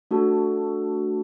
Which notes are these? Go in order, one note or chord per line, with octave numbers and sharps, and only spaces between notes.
A3 D4 F#4 A4